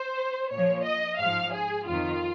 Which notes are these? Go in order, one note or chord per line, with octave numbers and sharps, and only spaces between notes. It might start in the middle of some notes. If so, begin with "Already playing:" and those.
Already playing: C5
A#2 C#5
F3
D#5
G#2 F3 F5
G#4
F2 D#3 F4